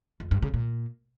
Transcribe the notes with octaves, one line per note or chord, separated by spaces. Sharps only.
F2
G2
C#3
A#2